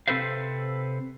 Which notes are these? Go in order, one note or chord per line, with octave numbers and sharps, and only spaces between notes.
C3 C4 A4 B4 C5 F5